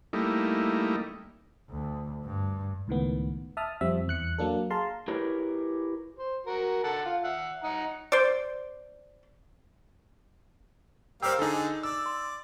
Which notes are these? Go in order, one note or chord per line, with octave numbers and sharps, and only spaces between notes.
G3 A3 A#3 D#4 E4
D2
G2
C#2 A2 D#3 B3
E5 A5 D#6 F6
F2 G3 C4 E5
E2 F#6 C#7
F#3 A#3 D4 A4
G#4 F5 A5 A#5 C6
E4 G4 G#4 A#4 B4 C#5
C5
F#4 A#4
A4 F#5 A5
F4
E5 F#5
D#4 F#5 A#5
C5 D5
G3 A#3 C5 F5 G5 E6
D3 D#4 G#4 A4
D5 E6
C6